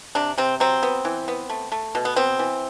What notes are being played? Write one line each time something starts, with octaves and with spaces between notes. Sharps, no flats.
C3 D4
C3 C4
F#3 C4
B3
E3
B3
A3
A3
B2
B3
B3 C4
E3